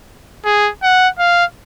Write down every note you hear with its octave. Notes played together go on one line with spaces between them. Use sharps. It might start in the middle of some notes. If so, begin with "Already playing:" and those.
G#4
F#5
F5